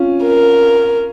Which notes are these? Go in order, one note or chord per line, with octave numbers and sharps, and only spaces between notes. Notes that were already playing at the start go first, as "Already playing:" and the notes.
Already playing: C#4 F4
A#4